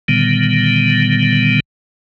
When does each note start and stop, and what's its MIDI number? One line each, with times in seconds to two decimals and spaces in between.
0.08 1.60 46
0.08 1.60 50
0.08 1.60 51
0.08 1.60 55
0.08 1.60 59